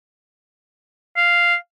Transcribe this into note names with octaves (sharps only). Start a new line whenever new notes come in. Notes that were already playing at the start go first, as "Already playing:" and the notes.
F5